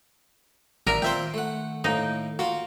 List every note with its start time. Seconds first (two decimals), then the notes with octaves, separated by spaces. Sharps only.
0.87 A1 D#3 A#4 D5 E5 F6
1.02 A#2 D#3 C4 C5 E5 G5 C6
1.34 A3 F#5
1.84 A2 A#3 D#4
2.39 A#3 F4 F#4